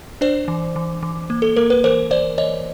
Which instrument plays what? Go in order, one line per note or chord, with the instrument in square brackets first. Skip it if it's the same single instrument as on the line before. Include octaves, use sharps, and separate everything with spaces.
[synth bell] D4 C5 D5
E3
E3
E3
A#3
A4
A#3 A#4
B4
E3 A#4 C5
E3 C5 D5
E3 C#5 D#5